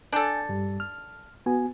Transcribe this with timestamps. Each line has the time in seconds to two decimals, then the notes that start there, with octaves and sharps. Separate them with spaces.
0.13 D4 A4 G#5 G6
0.49 G2 G3
0.80 F6
1.46 B3 F#4 G#5